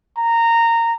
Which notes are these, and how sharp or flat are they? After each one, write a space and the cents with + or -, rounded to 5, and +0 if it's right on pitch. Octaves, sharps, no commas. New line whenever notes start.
A#5 -15